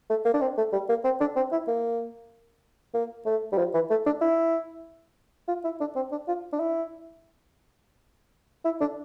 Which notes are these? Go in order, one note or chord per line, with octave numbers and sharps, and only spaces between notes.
A3
A#3
D4
C4
A3
G3
A#3
C4
D4
C4
E4
A#3
A#3
A3
G3
F3
E3
A3
D4
E4
F4
E4
D4
C4
D4
F4
D4
E4
E4
D4